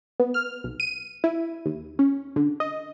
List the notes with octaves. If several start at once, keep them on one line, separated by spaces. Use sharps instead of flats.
B3
F6
B1
D#7
E4
D#2
C#4
D3
D#5